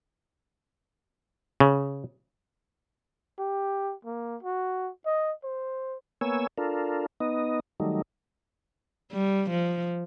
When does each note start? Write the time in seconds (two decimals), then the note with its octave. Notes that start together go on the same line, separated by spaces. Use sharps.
1.60 C#3
3.39 G4
4.05 A#3
4.43 F#4
5.06 D#5
5.44 C5
6.21 A#3 B3 C#5 G#5 E6
6.58 D4 F4 A4 A#4
7.20 B3 D#4 D#5
7.80 D#3 F#3 G3 A3 D#4
9.12 G3
9.50 F3